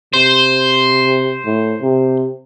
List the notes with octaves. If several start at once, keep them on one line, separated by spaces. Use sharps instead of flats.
C3 C5
A2
C3